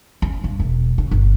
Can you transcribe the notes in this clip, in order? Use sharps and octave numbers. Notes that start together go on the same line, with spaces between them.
C#4
G2
E1
C#3
G1